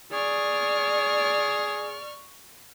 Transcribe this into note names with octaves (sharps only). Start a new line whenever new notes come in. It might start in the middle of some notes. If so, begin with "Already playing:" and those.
G#4 D5 C#6 F6